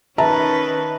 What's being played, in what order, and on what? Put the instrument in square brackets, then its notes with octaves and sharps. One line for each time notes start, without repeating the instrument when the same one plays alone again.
[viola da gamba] D#3 C#4 B4 [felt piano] E5 A5 A#5